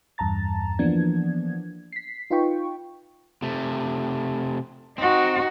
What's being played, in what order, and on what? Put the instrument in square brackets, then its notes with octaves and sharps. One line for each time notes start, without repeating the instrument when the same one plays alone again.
[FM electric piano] E2 G2 A5 A#5 A6
E3 F3 A#3 B3 D4 G#6
B6 C7
D#4 F4 B4 G5 C#6
[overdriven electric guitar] C3 A3
[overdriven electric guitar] C4 [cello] D#4 F#4